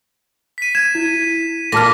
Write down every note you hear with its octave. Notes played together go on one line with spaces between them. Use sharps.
B6 D#7
G#6 E7
E4
A#2 F4 A4 A5 F6 A#6